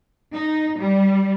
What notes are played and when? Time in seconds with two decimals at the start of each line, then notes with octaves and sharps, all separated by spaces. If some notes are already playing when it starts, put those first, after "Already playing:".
0.33 D#4
0.79 G3